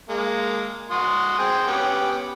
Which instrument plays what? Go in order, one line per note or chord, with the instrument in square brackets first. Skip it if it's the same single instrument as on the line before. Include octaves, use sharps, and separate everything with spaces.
[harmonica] G#3 A#3
F#4 C6 D#6
G#4 C5 G5
B3 C#4 G4